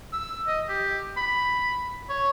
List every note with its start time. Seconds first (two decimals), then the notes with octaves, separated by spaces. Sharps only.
0.13 E6
0.47 D#5
0.69 G4
1.17 B5
2.09 C#5